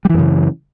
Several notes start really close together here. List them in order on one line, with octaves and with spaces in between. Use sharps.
G3 E3 F#2 C#3